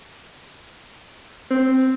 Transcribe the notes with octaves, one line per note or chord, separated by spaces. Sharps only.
C4